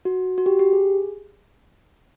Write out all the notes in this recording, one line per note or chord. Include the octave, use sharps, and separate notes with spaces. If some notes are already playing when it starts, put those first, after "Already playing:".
F#4
F#4
G4
G4
G#4